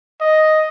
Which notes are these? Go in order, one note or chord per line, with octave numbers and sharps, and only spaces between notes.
D#5